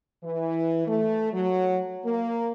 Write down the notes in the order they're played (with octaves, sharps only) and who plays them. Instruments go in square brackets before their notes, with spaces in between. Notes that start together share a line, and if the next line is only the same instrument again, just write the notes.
[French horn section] E3
A3
F#3
A#3